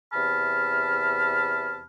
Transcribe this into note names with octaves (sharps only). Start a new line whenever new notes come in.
E2 C3 A5 B5 F6